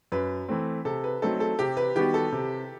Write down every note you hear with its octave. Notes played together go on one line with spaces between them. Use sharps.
F#2 B4
E3 A3 C4
C3 A4
B4
F#3 A3 C4 D#4 A4
A4
C3 G4
B4
D#3 G3 B3 F#4 G4
A4
C3